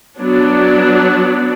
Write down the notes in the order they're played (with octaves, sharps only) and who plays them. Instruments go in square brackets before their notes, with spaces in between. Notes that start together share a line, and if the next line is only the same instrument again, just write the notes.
[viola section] F#3 B3 D4